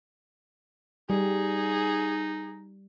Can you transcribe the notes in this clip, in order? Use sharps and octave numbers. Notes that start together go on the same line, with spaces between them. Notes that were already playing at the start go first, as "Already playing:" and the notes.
G3 D#4 G#4